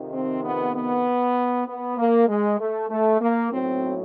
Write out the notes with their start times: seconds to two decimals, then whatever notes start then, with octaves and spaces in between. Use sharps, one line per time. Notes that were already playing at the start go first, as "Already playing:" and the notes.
Already playing: F2 C3 D#3
0.13 C4
0.44 B3
0.74 B3
1.67 B3
1.97 A#3
2.28 G#3
2.59 A3
2.90 A3
3.21 A#3
3.51 B1 A2 F#3 C4